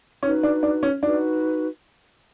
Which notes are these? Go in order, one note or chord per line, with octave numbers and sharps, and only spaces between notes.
C#4 D#4 F#4 B4
D4
D4
C#4
D4 D#4 F#4 B4